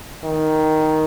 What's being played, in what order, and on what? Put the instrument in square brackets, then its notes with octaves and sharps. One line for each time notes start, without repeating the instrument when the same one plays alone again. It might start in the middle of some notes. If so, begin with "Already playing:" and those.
[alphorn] D#3